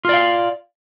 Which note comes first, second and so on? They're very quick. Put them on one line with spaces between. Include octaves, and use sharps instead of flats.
F4 D5 F5